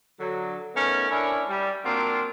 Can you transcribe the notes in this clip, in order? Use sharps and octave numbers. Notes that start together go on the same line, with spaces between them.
D3 F#3
A3 B3 C#4 D#4 A#4
C#4 D4 E4 A#4 C#5
G3
F#3 A#3 C4 D4 F4